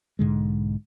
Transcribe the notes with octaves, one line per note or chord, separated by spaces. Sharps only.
B1 G#2 D3 G#3